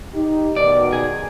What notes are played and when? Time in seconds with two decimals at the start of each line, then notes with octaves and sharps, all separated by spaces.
0.14 D#4 G4
0.56 B2 D#3 D5
0.93 G#4